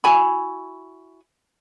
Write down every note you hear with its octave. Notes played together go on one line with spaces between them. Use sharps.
E4 F#4 G#5 B5